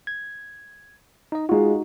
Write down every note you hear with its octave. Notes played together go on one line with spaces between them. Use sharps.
G#6
D#4 D#5
G#3 D#4 F4 F#4